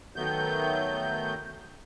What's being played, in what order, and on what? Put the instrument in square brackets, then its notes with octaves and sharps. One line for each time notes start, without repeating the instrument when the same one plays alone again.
[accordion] D#3 F#3 A3 B3 G6